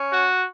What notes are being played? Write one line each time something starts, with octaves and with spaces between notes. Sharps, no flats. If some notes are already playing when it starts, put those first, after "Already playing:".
Already playing: C#4
F#4